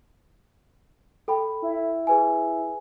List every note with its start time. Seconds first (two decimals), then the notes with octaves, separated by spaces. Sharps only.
1.28 A4 G5 B5
1.62 E4
2.07 G#4 B4 G#5